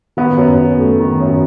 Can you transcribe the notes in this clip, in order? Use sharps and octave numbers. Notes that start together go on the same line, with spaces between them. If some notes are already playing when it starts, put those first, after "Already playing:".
D#3 B3
F#2
F#2
A3
D#3
F#2